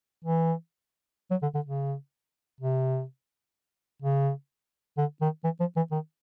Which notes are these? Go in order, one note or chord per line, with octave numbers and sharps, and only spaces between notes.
E3
F#3
D3
D3
C#3
C3
C#3
D3
D#3
E3
F3
E3
D#3